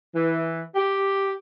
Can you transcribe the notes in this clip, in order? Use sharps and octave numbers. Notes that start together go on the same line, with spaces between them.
E3
G4